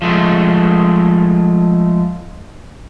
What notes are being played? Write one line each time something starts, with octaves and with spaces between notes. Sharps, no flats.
F3 G#3 A3